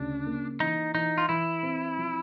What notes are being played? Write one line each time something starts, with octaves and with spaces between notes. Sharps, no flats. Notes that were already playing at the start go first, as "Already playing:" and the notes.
Already playing: D2 C#3 D4
A#3
E3 D#4
E3 D#4
F4
E3 E4
C4
F3